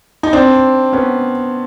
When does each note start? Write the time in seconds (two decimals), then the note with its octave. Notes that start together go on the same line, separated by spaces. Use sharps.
0.23 D#4
0.33 C4 D4
0.93 B3 C#4